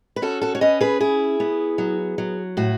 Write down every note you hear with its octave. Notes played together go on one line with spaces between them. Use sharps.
B4
C#4 F#4 A4
F#4 A4
C#5
C#4 B4 D#5
G#4 B4
E4 G#4
B3
F#3
F#3
A2 F#4